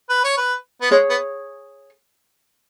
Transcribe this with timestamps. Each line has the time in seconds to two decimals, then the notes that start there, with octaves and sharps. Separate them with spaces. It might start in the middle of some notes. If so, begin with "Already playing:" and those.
0.10 B4
0.24 C#5
0.37 B4
0.81 B3
0.91 G#3 G#4 C#5
1.10 B3